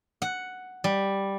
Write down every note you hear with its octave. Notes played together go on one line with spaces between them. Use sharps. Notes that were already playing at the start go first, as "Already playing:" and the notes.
F#5
G3